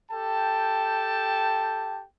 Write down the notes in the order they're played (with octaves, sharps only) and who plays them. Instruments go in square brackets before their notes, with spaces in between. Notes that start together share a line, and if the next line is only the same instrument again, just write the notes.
[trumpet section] G4 A4 G5 A5